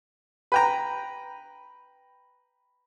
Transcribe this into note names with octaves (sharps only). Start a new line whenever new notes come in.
B4 G5 A#5